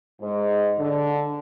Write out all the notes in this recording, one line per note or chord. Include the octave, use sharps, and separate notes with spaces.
G#2
D3